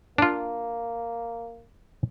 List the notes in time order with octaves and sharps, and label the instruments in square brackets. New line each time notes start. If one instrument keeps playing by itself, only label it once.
[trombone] A#3 [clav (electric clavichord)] D4 F4